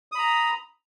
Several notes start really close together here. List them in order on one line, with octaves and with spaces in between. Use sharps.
D#6 B5 A#5